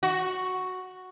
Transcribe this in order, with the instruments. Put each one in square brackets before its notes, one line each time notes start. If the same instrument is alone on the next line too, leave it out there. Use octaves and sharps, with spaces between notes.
[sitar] F#4